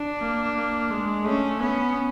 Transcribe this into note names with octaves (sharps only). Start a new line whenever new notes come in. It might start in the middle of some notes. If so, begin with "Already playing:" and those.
Already playing: D4
A#3
A#3
G#3
A3 C#4
B3 C#4